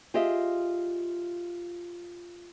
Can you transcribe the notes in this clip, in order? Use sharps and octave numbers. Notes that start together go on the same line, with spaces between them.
F4 G4 G#4 D#5 E5